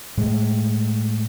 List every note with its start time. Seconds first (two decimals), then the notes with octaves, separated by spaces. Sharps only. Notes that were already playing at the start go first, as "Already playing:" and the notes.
0.17 A2 G#3